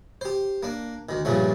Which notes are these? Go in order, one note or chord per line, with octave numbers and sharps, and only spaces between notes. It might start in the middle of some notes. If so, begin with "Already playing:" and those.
G4 C5
A#3 D4
D2 D#3
G2 A#2 C#3 F3 A3